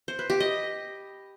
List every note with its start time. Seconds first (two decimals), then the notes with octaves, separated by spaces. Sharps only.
0.08 C5
0.19 B4
0.30 G4
0.40 D#5